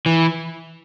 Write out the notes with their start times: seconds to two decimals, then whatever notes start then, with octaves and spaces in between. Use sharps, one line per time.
0.06 E3